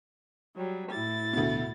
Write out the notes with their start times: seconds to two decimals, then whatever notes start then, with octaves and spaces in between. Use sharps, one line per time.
0.56 F#3 G3
0.91 A2 E4 A6
1.33 D2 B2